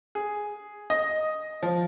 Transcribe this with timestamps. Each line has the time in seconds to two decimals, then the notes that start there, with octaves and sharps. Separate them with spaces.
0.15 G#4
0.90 D#5
1.62 F3